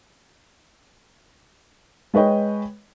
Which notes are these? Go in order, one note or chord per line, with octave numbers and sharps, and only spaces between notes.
G#3 B4 C#5 D#5 G5